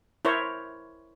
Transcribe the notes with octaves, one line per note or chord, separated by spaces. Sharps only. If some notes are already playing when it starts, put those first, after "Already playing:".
E4 A#4 C5 C#5